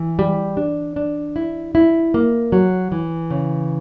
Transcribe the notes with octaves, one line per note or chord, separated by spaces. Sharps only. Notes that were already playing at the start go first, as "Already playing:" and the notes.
Already playing: E3
G3
D4
D4
E4
E4
A#3
F#3
E3
C#3